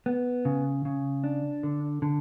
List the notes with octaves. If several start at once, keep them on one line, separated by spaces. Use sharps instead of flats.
B3
C#3
C#3
D4
D3
D3